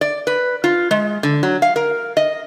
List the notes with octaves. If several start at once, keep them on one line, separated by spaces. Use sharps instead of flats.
D5
B4
F4
G#3
D3
F#3
F5
A#4
D#5